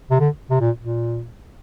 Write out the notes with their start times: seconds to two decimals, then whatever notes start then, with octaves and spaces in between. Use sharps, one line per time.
0.10 C3
0.20 D3
0.50 C3
0.60 A#2
0.80 A#2